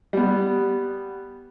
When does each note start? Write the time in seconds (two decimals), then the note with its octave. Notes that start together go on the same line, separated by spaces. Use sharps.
0.13 G3 B3